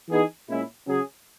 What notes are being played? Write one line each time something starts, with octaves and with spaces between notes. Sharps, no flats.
E3 B3 D#4 G#4
A#2 G#3 C#4 E4
C#3 F#3 C#4 G#4